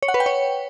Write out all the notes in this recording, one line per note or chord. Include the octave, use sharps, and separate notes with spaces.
C#5
F#5
B4
G5
C#5